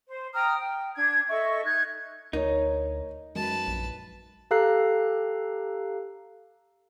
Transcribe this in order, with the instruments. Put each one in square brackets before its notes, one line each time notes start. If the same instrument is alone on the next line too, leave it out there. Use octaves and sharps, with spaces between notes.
[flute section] C5
G5 A#5 D#6 F6
G5
D4 G#6
A4 D#5 E5 C#6
D#4 F#6 G#6
[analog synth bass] D2 [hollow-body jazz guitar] D#4 [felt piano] A#4 C#5
[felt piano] F#2 [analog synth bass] G#3 [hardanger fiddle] B4 A5
[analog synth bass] A#1
[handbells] G4 A4 F5 A#5 F#6 C7